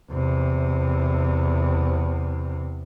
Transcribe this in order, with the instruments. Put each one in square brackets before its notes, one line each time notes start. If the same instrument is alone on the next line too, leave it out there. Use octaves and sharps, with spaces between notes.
[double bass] E2 C3